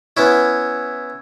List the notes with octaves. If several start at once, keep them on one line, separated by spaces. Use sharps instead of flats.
B3 C#4 E4 C#6 E6 G#6